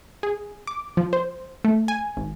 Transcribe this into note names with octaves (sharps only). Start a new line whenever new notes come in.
G#4
D6
F3
C5
A3
G#5
G#1